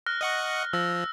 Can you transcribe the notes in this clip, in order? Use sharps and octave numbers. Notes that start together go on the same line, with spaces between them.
F6 F#6 A#6
D#5 F#5 C#6
F3 E6 A#6